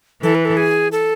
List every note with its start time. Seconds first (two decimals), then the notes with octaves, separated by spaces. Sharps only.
0.22 E3 A4
0.35 B4
0.45 A4
0.57 G#4
0.92 A4